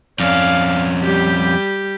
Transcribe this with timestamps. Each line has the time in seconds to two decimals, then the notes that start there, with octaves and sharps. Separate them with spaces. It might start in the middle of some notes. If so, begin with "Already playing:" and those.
0.20 F2 C#4 D5 F5
1.03 G3 G4